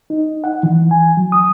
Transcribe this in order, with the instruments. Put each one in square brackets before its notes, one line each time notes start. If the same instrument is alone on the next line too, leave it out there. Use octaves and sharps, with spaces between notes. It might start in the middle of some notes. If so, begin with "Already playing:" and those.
[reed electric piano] D#4
F#5
E3
G#5
F#3
D#6